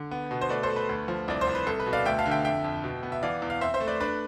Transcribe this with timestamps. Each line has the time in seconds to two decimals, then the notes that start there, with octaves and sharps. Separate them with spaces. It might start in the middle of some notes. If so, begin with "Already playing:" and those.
Already playing: D3
0.11 B3
0.31 B2
0.41 C5
0.49 A3 B4 D5
0.63 A4 C5
0.69 A3
0.76 B4
0.89 D2
1.08 F3
1.28 C2 D5
1.41 C5
1.47 C2
1.55 B4
1.67 C2 A4
1.80 B4
1.86 B2
1.93 D5 F5
2.05 D2 E5 G5
2.19 F5 A5
2.26 D3
2.31 E5 G5
2.45 F2 E5 G5
2.64 F2
2.84 B2
3.03 B3
3.12 E5
3.23 E3 D5 F5
3.42 E2
3.50 F5
3.61 C4 C5 E5
3.74 C5 E5
3.80 A3
3.87 B4 D5
4.00 D4 B4 D5